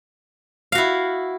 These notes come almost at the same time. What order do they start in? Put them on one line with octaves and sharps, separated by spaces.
F5 F#4 E4